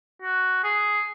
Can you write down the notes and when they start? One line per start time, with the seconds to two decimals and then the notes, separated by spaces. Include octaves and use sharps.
0.22 F#4
0.64 G#4